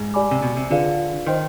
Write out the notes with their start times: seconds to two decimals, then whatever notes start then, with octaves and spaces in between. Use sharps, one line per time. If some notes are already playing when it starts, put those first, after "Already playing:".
Already playing: G#2
0.14 G4 D5 G#5 B5 D6
0.31 C3
0.42 B2
0.57 C3
0.70 D3 F4 G#4 B4 D5 F5
1.27 D#3 C5 D#5 G5 C6